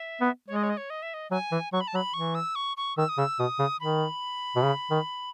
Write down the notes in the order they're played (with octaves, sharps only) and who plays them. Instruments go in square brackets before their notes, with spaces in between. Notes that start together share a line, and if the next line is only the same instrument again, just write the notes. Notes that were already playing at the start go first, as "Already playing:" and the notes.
Already playing: [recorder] E5
[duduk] B3
[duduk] G#3 [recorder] C#5
[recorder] D#5
C#5
D#5
C#5
D#5
E5
D#5
[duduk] F#3 [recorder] G#5
[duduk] E3
[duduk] F#3 [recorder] C#6
[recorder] B5
A5
[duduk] F#3 [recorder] B5
[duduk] E3 [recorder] C#6
[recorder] E6
C#6
C#6
[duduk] D#3 [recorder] E6
[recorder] D#6
[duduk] C#3 [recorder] E6
[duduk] B2 [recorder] D#6
[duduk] C#3
[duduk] D#3 [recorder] B5
[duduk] B2
C#3
D#3